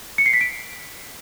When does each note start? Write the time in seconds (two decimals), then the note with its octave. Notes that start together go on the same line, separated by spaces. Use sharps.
0.18 C#7
0.26 C7
0.33 B6
0.41 D7